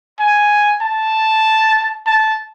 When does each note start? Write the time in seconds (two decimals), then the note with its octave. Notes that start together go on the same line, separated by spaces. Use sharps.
0.20 G#5
0.82 A5
2.07 A5